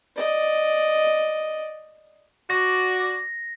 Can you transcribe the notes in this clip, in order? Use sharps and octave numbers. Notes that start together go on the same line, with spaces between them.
D5 D#5
F#4 D5 A#6